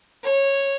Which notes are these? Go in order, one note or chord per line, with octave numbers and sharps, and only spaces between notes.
C#5